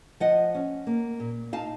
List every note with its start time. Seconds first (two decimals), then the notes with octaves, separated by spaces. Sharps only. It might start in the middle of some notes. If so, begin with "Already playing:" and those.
0.20 F3 D#5 F#5
0.55 C#4
0.87 A#3
1.20 A#2
1.53 D#4 F5 A5